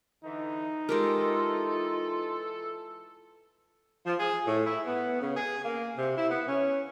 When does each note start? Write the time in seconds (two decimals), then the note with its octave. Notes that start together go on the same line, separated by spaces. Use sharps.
0.25 D3 E3 D#4
0.89 E3 G#3 F4 G4 A4 A#4
4.06 F3
4.20 G#4
4.45 A2
4.66 E4
4.86 B3
5.21 C#3
5.35 G#4
5.63 A#3
5.98 C3
6.17 E4
6.29 B3
6.47 C#4